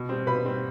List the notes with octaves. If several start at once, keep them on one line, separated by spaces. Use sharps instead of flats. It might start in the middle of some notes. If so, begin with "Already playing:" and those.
Already playing: B2
G3 C4
B2 B4 B5
G3 C4